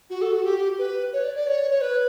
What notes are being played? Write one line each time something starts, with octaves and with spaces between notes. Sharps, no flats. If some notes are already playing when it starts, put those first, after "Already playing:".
F#4
A4
F#4
G4
B4
C#5
D5
D5
C#5
C#5
B4